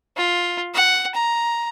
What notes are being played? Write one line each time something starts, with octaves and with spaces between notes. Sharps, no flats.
F4
F#5
A#5